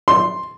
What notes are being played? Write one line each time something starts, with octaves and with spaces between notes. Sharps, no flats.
C6